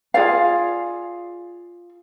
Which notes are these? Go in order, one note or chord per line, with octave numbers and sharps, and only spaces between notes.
F4 G#4 D5 F5